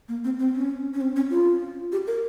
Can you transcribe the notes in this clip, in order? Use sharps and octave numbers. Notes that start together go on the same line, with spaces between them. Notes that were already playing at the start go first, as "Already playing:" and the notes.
A#3
C4
C4
C#4
C#4
C4
C#4
F4
G4
A#4